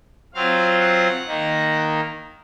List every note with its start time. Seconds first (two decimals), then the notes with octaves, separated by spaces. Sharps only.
0.34 F#3 C4 F4 F5
0.80 F#5
1.27 D#3 A#3 D#4